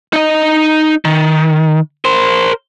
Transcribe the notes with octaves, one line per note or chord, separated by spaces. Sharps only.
D#4 D#5
D#3
A#4 C5